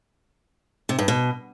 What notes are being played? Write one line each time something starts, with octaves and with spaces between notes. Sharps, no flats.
C3
G2
B2